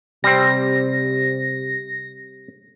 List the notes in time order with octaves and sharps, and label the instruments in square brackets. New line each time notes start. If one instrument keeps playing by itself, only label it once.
[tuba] C3 [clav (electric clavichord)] G3 C4 [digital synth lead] A#6